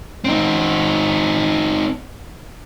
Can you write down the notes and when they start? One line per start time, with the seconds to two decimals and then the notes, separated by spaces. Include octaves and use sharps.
0.24 C4 D#4